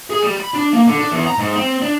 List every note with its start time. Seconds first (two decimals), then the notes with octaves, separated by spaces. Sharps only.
0.10 G#4
0.22 G3
0.36 B5
0.54 D4
0.73 A#3
0.87 D3
0.99 D4
1.11 E2
1.27 A#5
1.38 G#2
1.55 C4
1.82 D4